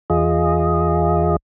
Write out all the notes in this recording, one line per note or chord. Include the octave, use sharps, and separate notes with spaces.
E2 F4 G#4 D#5